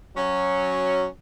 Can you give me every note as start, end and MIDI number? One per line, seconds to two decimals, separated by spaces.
0.16 1.06 54
0.16 1.06 61